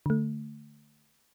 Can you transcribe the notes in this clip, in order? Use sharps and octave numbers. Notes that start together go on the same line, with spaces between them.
D3 A3